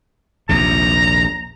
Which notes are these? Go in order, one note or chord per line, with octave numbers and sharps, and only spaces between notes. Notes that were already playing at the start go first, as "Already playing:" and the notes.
A#1 D#2 C3 A#5